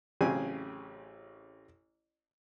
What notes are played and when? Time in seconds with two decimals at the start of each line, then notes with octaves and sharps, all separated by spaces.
0.21 A1 C#3 F#3 C4 G#5